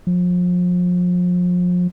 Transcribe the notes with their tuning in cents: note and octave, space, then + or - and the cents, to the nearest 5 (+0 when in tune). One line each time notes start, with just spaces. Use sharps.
F3 +35